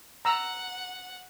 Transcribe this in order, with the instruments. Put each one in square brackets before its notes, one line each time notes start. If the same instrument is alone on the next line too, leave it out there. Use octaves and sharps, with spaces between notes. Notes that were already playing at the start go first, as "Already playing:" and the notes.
[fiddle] F#5 [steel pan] A#5 E6